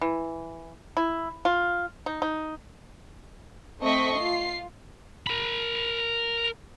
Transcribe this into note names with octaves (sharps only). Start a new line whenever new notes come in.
E3
E4
F4
D#4
D#4
A3 C4 D#5 C#6 B6
F4 C7
A#4 B5